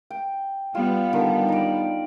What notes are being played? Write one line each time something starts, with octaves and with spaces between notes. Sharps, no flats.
G5
G3 B3 F4
D3 D#3
D#4 D5